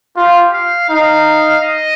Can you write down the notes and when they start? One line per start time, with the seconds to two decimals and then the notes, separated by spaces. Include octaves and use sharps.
0.17 F4 G4
0.54 F5
0.90 D#4 F5
1.64 D#5